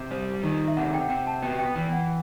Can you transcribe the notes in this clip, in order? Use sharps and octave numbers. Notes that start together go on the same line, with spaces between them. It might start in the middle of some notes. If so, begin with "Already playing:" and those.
Already playing: C3
G3 C5
D#3
E5
C3 F#5
G5
F#5
C3 G5
A5
B3 G5
G5
E3 G5
F#5